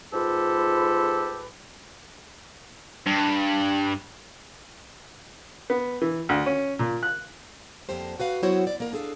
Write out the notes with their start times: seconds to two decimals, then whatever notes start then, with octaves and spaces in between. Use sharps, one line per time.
0.12 G#2 F4 G4 A4 B4
3.06 G2
5.70 B3
6.02 E3
6.29 D2
6.46 C#4
6.79 A#2
7.03 F#6
7.89 F2 D3 A#3 G4 C5
8.20 F#4 B4 F5
8.42 F#3 B3 E4 F#4 C5 C#5
8.67 D5
8.80 A#3 A#4
8.93 D4 G#4 A4 F5